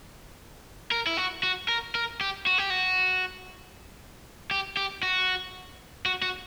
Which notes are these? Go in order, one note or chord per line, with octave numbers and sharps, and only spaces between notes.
A#4
E4
F#4
F#4
A#4
A#4
G4
F#4
G4
F#4
G4
G4
F#4
F#4
F#4